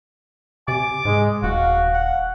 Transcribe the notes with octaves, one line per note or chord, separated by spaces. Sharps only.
C3 G#5 D6
G#2 G#3
D#1 F#4 F5
F#5